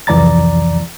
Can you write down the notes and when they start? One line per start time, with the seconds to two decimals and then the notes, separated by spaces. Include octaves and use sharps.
0.07 C2 F2 E3 D5 A#5 A6